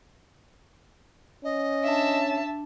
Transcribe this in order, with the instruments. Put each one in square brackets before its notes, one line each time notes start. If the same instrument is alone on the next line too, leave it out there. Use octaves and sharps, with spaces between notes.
[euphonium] C#4 [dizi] D#5
[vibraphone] D4 [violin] E5 A5